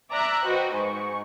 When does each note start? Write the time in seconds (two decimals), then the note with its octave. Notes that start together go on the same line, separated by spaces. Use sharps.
0.11 D5 E5 A#5 D6 E6 F#6
0.45 F#4 B4 C5 D#5 G5
0.75 G#2 C#6